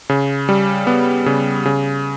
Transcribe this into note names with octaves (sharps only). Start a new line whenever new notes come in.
C#3
G3
B3
C#3
C#3